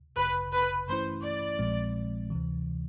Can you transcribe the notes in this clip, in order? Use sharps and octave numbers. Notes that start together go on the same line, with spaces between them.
G#1 F#2 C#3 B4
B4
G2 E3 A3 C#4 E4 C5
D5
A#1 A#2 F3 G#3 C4
D2 C3 E3